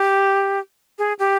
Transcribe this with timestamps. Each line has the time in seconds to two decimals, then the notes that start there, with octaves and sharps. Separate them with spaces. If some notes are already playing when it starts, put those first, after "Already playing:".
Already playing: G4
0.99 G#4
1.19 G4